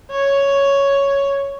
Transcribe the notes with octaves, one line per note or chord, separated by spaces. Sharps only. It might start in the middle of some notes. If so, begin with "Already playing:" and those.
C#5